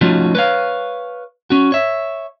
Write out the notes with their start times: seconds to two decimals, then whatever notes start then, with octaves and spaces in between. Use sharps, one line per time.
0.01 F3 A3 C#4 D#4 F4 F#4
0.35 B4 C#5 F5
1.50 C#4 F#4
1.72 C#5 E5